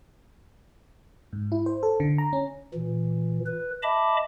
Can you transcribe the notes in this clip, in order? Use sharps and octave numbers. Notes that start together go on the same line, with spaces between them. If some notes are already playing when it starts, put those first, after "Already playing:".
G#2
E4
C5
A4
D3
A#5
C#4
A#2 E3
B4
D#5 E5 A5 B5 D6